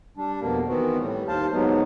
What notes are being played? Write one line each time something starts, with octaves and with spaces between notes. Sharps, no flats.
G3 D4
F2 B2 A#3
D#3 E3 B3 C4 F#4
A2 G3
D#2 C5 F5 A5
G#2 F#3 G#3 B3